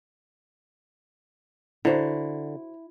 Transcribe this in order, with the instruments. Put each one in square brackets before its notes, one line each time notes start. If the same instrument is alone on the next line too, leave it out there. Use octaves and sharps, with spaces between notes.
[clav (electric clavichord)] D3 [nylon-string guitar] E4 [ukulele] F#4 C5 A#5